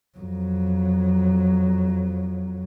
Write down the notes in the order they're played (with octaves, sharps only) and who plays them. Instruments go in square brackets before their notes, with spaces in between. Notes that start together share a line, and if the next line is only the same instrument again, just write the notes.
[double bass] F2 F#3